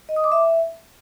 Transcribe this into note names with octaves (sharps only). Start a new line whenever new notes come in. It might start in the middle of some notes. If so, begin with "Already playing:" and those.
D#5
D#6
D6
E5